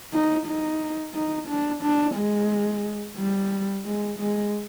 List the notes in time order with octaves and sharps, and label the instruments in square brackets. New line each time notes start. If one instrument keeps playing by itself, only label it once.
[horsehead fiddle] D#4
D#4
D#4
D4
D4
G#3
G3
G#3
G#3